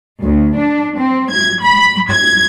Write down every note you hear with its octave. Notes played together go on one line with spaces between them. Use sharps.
D2
D4
C4
G#6
B5
G#6